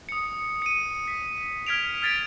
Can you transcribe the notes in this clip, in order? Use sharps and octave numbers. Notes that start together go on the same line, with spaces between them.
D#6 C#7
C#7 D#7
B6
F6 G#6 B6 D7 F7
F6 G#6 A6 B6 D7